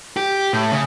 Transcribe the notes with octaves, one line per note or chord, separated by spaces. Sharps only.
G4
A2
C#3